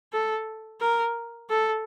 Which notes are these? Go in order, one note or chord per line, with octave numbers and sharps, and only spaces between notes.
A4
A#4
A4